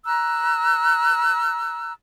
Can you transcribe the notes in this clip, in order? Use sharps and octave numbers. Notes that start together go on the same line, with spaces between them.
A#5 E6 F#6